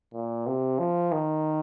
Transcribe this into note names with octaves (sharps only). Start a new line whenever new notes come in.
A#2
C3
F3
D#3